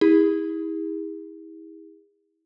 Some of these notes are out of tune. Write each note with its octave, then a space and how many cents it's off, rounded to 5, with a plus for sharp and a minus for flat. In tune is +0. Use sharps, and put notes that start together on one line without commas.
E4 -35 G#4 -40